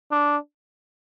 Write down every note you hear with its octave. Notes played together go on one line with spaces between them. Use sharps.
D4